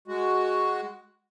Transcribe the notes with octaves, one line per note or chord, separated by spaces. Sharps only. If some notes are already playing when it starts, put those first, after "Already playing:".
G#3 F#4